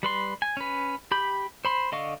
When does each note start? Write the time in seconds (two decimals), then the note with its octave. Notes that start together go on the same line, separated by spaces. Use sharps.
0.03 G3 B4 C6
0.42 G#5
0.57 C#4 B4
1.11 G4 B5 G6
1.65 C5 B5 C6
1.92 D3 D#5 F5 C#6